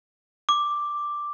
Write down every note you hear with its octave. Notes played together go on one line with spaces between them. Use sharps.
D6